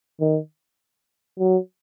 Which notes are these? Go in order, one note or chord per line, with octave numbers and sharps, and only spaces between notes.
D#3
F#3